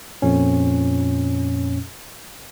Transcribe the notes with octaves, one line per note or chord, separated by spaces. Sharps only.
F2 A#2 C#4